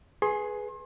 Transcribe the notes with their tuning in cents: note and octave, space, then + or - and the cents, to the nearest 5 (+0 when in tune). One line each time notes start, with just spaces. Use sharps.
G#4 +10 B4 +0 C6 +35